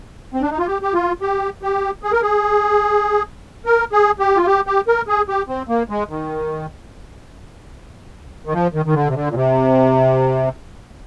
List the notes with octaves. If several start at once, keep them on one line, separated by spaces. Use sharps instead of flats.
C4
D4
D#4
F4
G4
G4
F4
G4
G4
G#4
A#4
G#4
A#4
G#4
G4
F4
G4
G4
A#4
G#4
G4
C4
A#3
G#3
D#3
D#3
F3
D#3
D#3
D3
C3
D3
A#2
C3